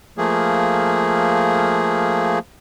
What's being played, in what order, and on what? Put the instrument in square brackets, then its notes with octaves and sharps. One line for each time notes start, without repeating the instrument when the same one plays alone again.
[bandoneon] F3 A3 A#3 G#4